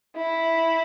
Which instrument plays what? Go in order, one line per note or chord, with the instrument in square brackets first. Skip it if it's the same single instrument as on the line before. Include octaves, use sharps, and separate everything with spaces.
[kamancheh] E4